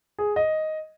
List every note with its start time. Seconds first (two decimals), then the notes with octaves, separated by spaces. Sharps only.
0.19 G#4
0.36 D#5